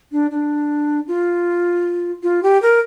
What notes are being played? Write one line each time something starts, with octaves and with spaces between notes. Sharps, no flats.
D4
D4
F4
F4
G4
A#4